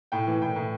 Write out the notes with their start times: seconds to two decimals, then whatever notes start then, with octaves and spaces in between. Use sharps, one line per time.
0.12 A2 G5
0.27 E3
0.42 A2 G5
0.56 A2